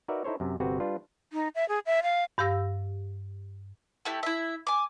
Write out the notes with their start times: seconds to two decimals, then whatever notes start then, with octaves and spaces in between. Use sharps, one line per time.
0.08 D#4 F#4 A#4 B4 D5 E5
0.24 D#4 E4 A4 C5 C#5
0.40 F#2 C3
0.60 G1 C3 C4 F#4 B4
0.80 G3 D4 F4 B4
1.33 D#4
1.55 E5
1.69 G#4
1.86 E5
2.03 F5
2.38 G2 G4 F5 E6 A#6
4.05 A3 E4 G4
4.23 E4 E5
4.67 G#5 D6